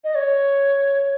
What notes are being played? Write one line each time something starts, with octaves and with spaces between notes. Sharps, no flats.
D#5
C#5